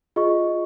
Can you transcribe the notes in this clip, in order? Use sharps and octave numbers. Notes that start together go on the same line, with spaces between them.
F4 G#4 D#5 C#6